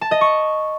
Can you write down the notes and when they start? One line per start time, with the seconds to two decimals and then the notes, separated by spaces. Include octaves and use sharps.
0.01 A5
0.11 D#5
0.21 C#6